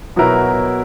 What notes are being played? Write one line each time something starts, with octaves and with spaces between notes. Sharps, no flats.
B2 F#3 B3 E4 A#4